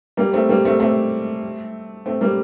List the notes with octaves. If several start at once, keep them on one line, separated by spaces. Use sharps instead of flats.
G3 A#3
A3 C4
G3 A#3
A3 C4
A3 C4
A3 C4
G3 A#3